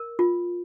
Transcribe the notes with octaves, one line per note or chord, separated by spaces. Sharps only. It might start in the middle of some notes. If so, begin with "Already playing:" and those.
Already playing: A#4
F4